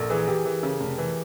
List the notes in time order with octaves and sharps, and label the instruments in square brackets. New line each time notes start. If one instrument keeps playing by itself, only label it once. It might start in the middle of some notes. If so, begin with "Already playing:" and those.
Already playing: [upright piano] A#1 [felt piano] A4 A#4
[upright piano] E3 [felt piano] G#4
[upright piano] E3 [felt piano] G4
[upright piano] E3
C#3
F1
E3